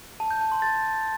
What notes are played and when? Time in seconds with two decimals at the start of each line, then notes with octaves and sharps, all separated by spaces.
0.20 A5
0.31 G6
0.41 A5
0.52 C6
0.62 A6